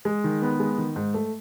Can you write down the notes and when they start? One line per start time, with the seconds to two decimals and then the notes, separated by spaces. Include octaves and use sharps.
0.05 G#3
0.24 D#3
0.42 B3
0.60 G#3
0.78 D#3
0.96 G#2
1.14 A3